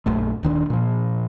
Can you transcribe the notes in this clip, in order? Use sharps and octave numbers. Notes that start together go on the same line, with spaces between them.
A#1 F#2 A3
D#1 D#3 C#4 D4
A#2 F3